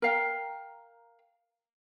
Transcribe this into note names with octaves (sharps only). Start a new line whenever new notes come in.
A#4 F5 G5